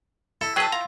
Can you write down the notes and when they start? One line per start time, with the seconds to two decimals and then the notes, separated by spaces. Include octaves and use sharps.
0.41 E4 A4
0.56 F#3 G#4 B4 G5 A5
0.72 F4 A#5